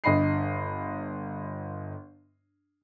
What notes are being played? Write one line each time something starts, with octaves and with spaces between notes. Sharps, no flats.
G1 D#5 B5 C7